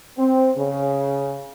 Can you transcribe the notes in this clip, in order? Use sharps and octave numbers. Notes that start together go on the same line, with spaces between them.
C4
C#3